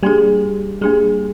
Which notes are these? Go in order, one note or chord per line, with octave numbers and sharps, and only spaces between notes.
G3 A#3 D4 G#4
G3 A#3 D4 G#4